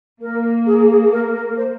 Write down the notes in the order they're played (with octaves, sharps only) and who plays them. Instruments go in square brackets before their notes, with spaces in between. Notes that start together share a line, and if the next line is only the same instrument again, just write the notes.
[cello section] A#3 [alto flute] A#4
[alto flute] G#4
G#4
A#4
A#4
C5